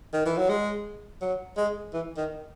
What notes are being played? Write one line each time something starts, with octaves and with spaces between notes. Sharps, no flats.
D#3
E3
F#3
G#3
F#3
G#3
E3
D#3